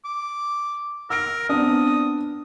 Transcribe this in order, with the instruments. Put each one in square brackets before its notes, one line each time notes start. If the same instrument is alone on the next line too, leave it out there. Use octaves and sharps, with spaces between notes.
[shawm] D6
[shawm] A#4 [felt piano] E6 A#6 D7
[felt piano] B3 C4 D4 [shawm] D#6